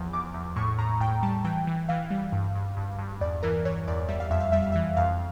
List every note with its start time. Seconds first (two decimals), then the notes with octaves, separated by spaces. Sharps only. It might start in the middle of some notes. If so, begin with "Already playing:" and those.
Already playing: E2 F3
0.13 E2 D6
0.34 E2
0.56 A2 C#6
0.78 A2 A#5
1.00 A2 G5
1.23 G3 A5
1.44 E3 G5
1.67 E3
1.89 E3 F5
2.11 G3
2.32 G2
2.55 G2
2.77 G2
2.98 G2
3.21 E2 D5
3.43 E3 A#4
3.65 E3 C#5
3.87 E2 D5
4.08 G3 E5
4.20 F5
4.30 F2 E5
4.40 F5
4.52 G3 E5
4.62 F5
4.72 E3 E5
4.97 F2 F5